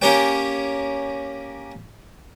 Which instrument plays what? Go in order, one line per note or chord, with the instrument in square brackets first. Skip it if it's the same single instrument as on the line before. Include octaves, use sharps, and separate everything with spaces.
[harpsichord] A#3 C#4 G4 A#4 C#5 G5